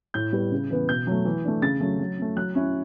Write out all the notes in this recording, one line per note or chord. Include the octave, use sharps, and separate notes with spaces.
A2 G6
G3 B3
C#3
E3 B3
B2 G6
F#3 A3
E3
A3 D4
C#3 A6
F#3 A3
F#3
A3 C#4
F#3 F#6
C#4 E4